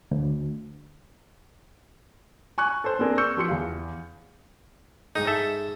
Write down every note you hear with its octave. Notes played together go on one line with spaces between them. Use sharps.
D2
G#5 C#6 F#6
A4 C5
A#3 C4 D4 G#4 A#4
C#6 E6 G6 C#7
F3 G4 C6 C#7
E2 F5
G#2 D#4 G#4
A4 E5